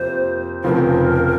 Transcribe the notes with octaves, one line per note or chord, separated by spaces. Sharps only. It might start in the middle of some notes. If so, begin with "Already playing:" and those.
Already playing: F2 C3 F3 A#3 C5
F1 F2 C#3 F3 C4 A#4